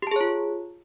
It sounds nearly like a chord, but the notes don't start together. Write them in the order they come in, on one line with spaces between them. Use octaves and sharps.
G4 A5 G#4 C#5 F4